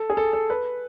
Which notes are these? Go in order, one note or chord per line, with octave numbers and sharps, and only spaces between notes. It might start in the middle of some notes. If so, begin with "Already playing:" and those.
Already playing: A4
G#4
A4
A4
B4